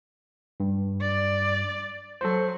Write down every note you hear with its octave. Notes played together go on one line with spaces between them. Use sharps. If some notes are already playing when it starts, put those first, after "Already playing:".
G2
D5
F#3 A4 C5